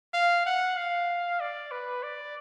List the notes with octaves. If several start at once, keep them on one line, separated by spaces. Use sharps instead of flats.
F5
F#5
F5
D5
B4
D5